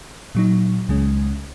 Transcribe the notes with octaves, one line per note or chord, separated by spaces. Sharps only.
A#2 F#3 D#4
C#2 C#3 G#3 C#4